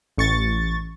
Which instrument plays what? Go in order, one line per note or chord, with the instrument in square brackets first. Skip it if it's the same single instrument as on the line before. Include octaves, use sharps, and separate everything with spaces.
[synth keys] A1 C#6 A6